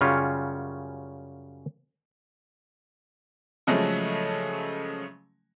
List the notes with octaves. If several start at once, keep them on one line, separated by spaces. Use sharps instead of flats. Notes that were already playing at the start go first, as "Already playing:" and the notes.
F#2 C#3 G3 C#4 F4 C#5
C#3 F3 F#3 G#3 A3